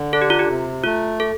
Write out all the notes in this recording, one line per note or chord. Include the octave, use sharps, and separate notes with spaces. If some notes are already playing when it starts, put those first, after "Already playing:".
Already playing: D3
D4 A4
G4
F4
G4
C3
A3 F4
A4